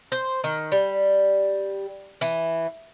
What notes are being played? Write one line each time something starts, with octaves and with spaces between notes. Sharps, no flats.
C5
D#3
G3
E3